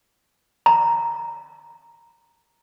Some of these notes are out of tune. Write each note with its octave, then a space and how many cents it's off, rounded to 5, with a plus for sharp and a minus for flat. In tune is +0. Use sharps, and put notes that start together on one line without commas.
A#5 -5